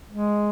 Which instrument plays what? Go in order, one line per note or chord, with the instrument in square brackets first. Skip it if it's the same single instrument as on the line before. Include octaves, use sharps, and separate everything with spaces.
[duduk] G#3